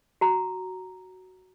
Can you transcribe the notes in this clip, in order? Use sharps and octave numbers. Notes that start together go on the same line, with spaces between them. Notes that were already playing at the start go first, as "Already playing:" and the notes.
F#4 A#5